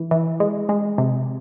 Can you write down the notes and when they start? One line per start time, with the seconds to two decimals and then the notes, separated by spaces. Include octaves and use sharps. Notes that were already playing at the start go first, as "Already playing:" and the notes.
Already playing: E3
0.11 E3
0.40 G#3
0.69 G#3
0.98 C3